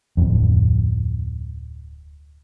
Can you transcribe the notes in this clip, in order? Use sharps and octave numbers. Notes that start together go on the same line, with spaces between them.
D1 F2